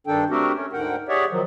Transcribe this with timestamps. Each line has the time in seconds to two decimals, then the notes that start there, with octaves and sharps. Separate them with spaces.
0.07 G2 D#3 D4 A4 G5
0.30 A3 C4 D4 F#4 G4 A#4
0.55 A3 C#4
0.73 D2 G#2 D3 A#4 F#5 G5
1.08 G4 G#4 C#5 D5 E5 F#5
1.30 D#3 F3 F#3